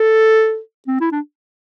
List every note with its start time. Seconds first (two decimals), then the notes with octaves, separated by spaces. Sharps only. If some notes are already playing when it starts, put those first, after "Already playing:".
Already playing: A4
0.87 C4
1.00 E4
1.12 D4